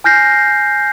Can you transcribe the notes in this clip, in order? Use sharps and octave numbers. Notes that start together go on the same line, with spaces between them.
G#5 F6 G6 A#6 C7